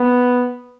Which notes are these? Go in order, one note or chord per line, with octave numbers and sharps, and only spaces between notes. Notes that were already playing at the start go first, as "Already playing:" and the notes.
Already playing: B3